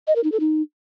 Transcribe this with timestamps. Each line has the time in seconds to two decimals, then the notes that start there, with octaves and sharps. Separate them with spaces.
0.07 D#5
0.16 A#4
0.24 D#4
0.32 A4
0.40 D#4